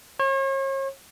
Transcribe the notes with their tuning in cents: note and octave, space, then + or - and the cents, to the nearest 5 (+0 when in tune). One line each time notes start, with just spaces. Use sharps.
C#5 -40